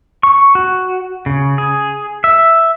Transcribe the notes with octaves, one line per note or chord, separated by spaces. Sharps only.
C#6
F#4
C#3
G#4
E5